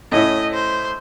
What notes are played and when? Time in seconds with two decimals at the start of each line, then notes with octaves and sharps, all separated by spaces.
0.12 A2 C#4 E4 D#5
0.53 C5